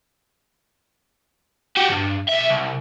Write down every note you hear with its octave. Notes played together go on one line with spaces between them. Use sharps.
F#4 G4
E2 G2
B1 E5
C2